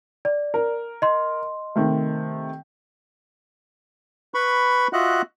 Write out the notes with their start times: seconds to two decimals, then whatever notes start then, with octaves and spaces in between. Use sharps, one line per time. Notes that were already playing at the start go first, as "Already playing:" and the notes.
0.25 D5
0.54 A#4
1.02 D#5 C6
1.76 C3 D#3 A3
4.34 B4 B5 C#6
4.93 F4 F#4 D#5 E5 F#5 F#6